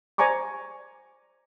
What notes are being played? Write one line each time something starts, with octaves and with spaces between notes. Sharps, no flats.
C5 D5 G#5 A#5 C#6 D6